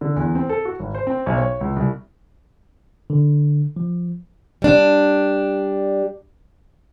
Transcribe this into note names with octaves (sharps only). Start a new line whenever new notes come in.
D3
E2
C4
A4
F#4
G#1
C5
C4
B1
C#5
C#2
C2
D3
F3
G3 D4